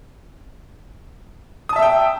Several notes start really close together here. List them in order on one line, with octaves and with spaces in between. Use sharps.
D#6 A5 E5 E6 G5